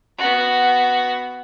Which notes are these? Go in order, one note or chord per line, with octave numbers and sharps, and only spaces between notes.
B3 F#4